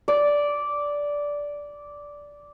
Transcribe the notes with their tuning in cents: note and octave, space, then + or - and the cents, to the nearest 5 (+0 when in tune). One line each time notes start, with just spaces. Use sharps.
D5 -10